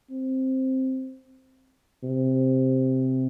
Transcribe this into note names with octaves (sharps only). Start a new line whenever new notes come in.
C4
C3